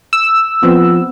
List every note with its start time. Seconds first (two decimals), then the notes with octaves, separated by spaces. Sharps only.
0.13 E6
0.63 F3 B3 C4